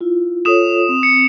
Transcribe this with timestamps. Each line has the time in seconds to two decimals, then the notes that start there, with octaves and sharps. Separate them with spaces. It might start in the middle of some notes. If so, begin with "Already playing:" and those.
0.01 E4 F4
0.45 F4 A4 C#5 D#6 E7
0.89 C4
1.03 C#7